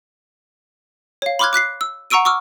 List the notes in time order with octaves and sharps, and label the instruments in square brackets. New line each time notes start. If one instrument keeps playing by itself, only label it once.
[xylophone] C#5 F5
B5 C6 D6 F6 F#6 G#6
D6 F#6 B6 C7
E6
F#5 A#5 C#6 E6 D7 D#7
C#6 D6 E6 F6